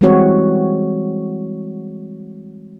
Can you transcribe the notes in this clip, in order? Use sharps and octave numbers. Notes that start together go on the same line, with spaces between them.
E3 G3 G#3 C4 F#4 C#5